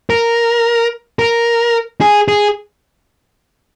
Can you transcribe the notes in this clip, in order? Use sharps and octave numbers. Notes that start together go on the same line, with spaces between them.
A#4
A#4
G#4
G#4